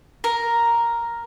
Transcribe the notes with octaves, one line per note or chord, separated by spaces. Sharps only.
A#4